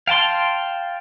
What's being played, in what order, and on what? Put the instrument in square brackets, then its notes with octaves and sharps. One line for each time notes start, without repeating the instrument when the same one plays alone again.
[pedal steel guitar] F5 G5 A5 C6